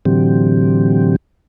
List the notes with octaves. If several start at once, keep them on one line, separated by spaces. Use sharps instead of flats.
A2 D3 E3 F#3 C4 G4